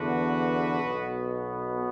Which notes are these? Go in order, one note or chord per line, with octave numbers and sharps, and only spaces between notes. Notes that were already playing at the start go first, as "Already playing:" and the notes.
Already playing: E2 D3 B3 F#4 B4
B1 B2 B3